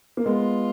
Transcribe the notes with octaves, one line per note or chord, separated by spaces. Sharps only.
A#3
G#3 B3 F4